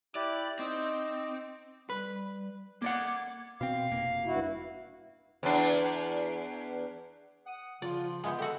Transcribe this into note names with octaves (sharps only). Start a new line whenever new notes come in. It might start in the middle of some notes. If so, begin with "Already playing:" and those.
E4 G4 D5 F#6
C4 D#4 D6
G3 B4
A#3 D5 F#5 D6 G#6
B2 C4 F5
F1 A#3
G2 E4 F#4
E2 D4
F#5 D#6
C#3 F3 F4 D5
G#3 B3 E5 G5
F#4 G4 A4